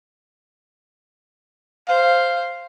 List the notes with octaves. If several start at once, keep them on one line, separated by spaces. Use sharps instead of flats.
C5 F5